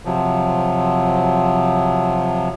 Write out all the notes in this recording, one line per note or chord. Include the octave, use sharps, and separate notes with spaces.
C3 F3 F#3